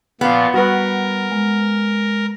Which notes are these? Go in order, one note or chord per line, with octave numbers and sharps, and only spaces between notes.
A#2 F3 B3
G3 F#4 A#4 B4
G#3